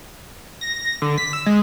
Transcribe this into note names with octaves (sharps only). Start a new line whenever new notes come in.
A#6
D3
B6
E6
G#3